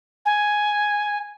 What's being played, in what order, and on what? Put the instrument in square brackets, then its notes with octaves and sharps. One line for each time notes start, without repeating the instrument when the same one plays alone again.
[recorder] G#5